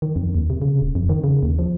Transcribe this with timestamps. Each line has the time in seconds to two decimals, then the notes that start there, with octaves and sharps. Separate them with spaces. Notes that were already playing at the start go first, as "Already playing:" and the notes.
0.02 D#3
0.16 F2
0.35 D#2
0.50 C3
0.62 C#3
0.82 D#1
0.95 F2
1.09 D#3
1.24 C#3
1.43 D#2
1.59 F3